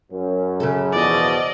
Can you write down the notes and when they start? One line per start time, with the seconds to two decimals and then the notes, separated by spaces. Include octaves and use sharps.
0.12 F#2
0.60 C#3 A4
0.93 E2 B2 F3 D5 D#5